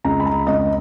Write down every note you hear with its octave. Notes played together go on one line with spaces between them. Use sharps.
C#2 A#5
B5
A#5
C#2 D#5